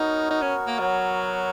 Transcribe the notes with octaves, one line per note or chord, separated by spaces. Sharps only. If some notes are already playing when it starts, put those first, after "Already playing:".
Already playing: B3 D#4 F#4 A#4 C#5
D#4
C#4
A#3
F#3